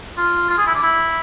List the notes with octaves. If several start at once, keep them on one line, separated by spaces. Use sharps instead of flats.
F4
F4
G#4
E4
D4
E4